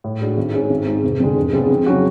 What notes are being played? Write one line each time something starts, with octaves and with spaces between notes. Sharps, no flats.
A2
G#3 D4 F#4
G#1
G#2 G#3 C#4 G#4
G#1
G#2 G#3
F1
F2 D3 G#3
F1
F2 C#3 G#3 B3
F2
C#3 F#3 C#4 F#4